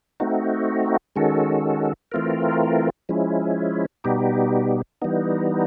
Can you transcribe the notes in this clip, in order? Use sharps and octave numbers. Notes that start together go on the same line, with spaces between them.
A3 C4 D#4 F#4
D#3 G#3 C#4 F#4 A4
E3 A3 C4 F4 A#4
F3 G#3 C#4 E4
B2 G3 B3 D#4 G4
E3 G3 B3 D#4